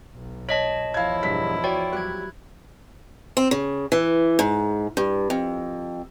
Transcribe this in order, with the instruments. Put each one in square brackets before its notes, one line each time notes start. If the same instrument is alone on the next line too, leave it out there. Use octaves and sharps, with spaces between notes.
[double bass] B1
[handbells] C#5 D#5 A5 [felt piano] B6
[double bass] E2 F3 [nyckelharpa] E4 [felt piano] F5 G#6
[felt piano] E1 G2 B6
[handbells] F#4 D5 G5 [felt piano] C#5
[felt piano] F#3 G3 G4 [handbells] F#6 G#6
[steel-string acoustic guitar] C4
C#3
E3
G#2
G2
F2